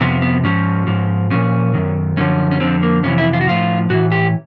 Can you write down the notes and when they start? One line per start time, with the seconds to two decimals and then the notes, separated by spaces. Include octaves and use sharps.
0.01 F2 C3 F3 B3
0.22 B3
0.43 G#2 F3 C#4
0.87 G#2 F3
1.30 A#2 F3 C#4
1.74 F#2 D#3
2.17 F#2 D3 F3 C#4
2.51 C#4
2.60 F2 D3 F3 C4
2.83 A#3
3.03 F2 C3 E3 C#4
3.18 E4
3.33 F4
3.41 F#4
3.47 A2 F3 F4
3.90 A2 E3 F#4
4.12 G4